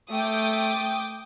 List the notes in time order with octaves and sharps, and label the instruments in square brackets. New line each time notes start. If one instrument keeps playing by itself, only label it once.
[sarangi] A3 [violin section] G5 D6 D#6